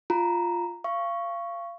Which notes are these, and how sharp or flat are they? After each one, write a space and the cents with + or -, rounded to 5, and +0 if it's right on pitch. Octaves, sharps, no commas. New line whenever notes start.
F4 +0 A#5 +0
F5 -25 C#6 +0